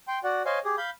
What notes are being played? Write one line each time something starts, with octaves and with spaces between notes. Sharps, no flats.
G5 C6
F#4 D5 F#5
C5 C#5 D#5 F5 G#5 C6
G4 G#4
F5 B5 G6